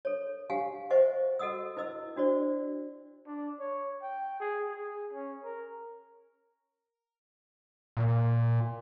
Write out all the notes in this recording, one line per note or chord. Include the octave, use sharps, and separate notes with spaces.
A4 C#5
G4 F5 F#5 G#5
B4 C5 D#5 E5 F#5 C#6
F#4 A4 D#5 F#5 D#6 E6
E4 B4 D#5 E6
D4 F#4 C5 D5
D4
C#5
G5
G#4
G#4
C#4
A#4
A#2